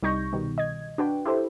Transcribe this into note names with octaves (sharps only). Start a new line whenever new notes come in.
C2 G3 D#4 C#6 G6 A#6
B2 D#3 G3
D#5 G#6
D4 F#4 B4 G5
E4 G4 A4 C5